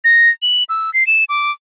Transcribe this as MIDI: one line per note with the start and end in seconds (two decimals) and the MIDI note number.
0.04 0.30 94
0.42 0.64 102
0.69 0.93 88
0.94 1.06 96
1.07 1.24 100
1.29 1.51 86